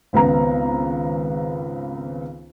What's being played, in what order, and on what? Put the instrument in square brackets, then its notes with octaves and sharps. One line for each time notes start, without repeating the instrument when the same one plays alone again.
[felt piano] G#1 C#2 B3 A#5